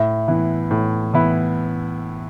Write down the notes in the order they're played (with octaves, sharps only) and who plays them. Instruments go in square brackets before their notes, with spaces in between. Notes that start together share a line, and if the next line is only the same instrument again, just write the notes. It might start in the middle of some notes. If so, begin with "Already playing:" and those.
Already playing: [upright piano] A2 [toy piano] E5
[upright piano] E3 B3 E4
A2
E3 B3 E4